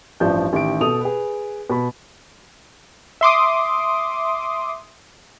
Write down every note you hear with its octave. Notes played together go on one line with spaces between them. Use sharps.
A1 G2 F3 D5 A5 G6
A1 D#3 G4 D7
B2 A4 D#6 F7
G#4 B4
B2 B5
E5 C6 D6 D#6